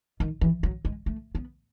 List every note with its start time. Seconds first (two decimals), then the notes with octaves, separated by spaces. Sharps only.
0.20 D#3
0.41 E3
0.63 F#3
0.85 G#3
1.06 A3
1.35 B3